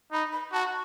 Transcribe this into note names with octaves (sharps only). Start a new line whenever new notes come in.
D#4 B5
B5
F#4 A5